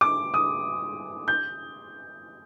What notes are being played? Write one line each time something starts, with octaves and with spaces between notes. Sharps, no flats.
D6
D#6
G6